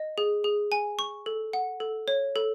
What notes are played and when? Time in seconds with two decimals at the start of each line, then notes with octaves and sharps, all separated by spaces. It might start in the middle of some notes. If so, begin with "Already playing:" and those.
Already playing: D#5
0.18 G#4
0.44 G#4
0.72 G#5
0.99 C#6
1.26 A4
1.53 F#5
1.80 A4
2.08 C#5
2.36 A4